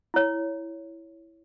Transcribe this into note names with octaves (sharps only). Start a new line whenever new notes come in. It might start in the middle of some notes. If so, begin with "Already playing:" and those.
E4 C#5